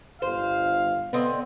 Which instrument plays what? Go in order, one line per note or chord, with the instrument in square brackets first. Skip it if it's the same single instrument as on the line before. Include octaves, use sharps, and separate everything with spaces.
[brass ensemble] G1 F5 [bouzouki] C5
[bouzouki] D3 C4 D#5 [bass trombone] B3